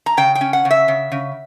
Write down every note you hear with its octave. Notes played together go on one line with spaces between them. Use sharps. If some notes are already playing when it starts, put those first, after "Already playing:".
A#5
C#3 G5
G5
C#4
F#5
C#3
E5
C#3
C#3